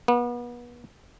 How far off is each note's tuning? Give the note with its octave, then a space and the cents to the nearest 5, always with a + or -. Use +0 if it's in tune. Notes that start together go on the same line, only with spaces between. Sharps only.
B3 -35